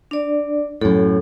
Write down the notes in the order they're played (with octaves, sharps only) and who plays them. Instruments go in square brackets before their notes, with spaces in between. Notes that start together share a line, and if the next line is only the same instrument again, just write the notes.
[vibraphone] D4 D5
[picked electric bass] F#2 A2 [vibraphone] A4